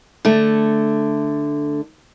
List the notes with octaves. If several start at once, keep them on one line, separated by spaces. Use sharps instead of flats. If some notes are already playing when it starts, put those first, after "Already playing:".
D3 A3